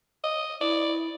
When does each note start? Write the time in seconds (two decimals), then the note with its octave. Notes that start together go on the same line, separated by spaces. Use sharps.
0.24 D#5
0.61 E4 D5